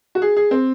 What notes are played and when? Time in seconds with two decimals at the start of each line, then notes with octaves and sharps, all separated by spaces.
0.15 F#4
0.22 G#4
0.37 G#4
0.51 C4